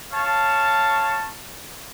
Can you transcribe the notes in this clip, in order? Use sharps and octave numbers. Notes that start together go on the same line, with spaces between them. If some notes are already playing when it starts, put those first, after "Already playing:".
C#5 F5 A5